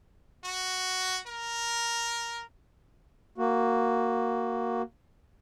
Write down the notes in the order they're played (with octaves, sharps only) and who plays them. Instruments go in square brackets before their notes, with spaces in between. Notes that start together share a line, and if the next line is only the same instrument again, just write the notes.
[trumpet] F#4
A#4
[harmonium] A#3 F#4